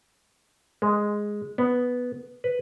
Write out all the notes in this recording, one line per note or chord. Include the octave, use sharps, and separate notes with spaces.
G#3
B3
B4